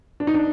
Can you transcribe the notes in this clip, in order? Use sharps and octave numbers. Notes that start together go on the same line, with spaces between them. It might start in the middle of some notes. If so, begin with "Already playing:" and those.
D4
D#4
D4